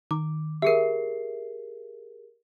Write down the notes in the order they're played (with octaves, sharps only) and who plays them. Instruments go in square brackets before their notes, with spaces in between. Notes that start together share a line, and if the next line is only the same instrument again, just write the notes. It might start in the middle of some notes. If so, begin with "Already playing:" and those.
[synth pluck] D#3 [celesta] D6
[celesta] G4 G#4 A#4 [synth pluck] E5 C7